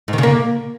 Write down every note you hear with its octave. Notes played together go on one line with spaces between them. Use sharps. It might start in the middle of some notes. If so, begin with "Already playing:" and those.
G#2
D#3
C#3
A#3